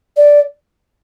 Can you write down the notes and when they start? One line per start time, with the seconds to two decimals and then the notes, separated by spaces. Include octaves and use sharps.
0.16 D5